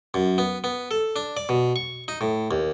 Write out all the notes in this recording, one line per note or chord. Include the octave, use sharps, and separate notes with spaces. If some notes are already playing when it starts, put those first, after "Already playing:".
F#2
B3
B3
A4
D4
D5
B2
C#6
D#4
A2
D#2